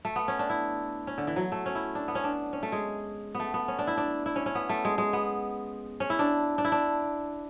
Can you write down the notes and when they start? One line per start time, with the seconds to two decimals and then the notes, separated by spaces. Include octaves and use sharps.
0.05 A3
0.16 B3
0.28 C#4
0.39 D4
0.50 E4
1.07 C#4
1.18 D3
1.27 E3
1.36 F#3
1.52 A3
1.66 C#4
1.75 E4
1.95 D4
2.08 B3
2.15 C#4
2.24 D4
2.53 C#4
2.63 A3
2.72 G#3
3.35 B3
3.40 A3
3.54 B3
3.68 C#4
3.79 D4
3.87 E4
3.97 D4
4.26 E4
4.36 C#4
4.46 C#4
4.55 B3
4.69 A3
4.85 G#3
4.98 G#3
5.13 B3
6.00 C#4
6.10 E4
6.19 D4
6.58 D4
6.65 E4
6.72 D4